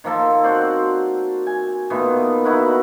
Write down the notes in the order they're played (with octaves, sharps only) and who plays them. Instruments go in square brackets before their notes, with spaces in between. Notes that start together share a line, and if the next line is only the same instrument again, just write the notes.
[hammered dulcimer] D#3 F3 A#3 A4
C4 F#4 C5 D5
G#5
A#2 D#3 A3 B3
D#4 E4 F#4 F#5